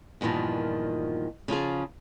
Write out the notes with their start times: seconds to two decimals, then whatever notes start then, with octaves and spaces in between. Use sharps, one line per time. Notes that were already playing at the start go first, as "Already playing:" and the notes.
0.21 E2 G2 A#2 D#3 F3
1.48 C#3 F3 F4 G#4